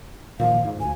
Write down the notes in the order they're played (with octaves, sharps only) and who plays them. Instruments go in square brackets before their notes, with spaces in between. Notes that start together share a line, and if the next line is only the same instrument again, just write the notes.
[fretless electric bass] A#2 D#3 F3 [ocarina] F5
[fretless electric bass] G#2
[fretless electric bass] D2 [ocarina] G#5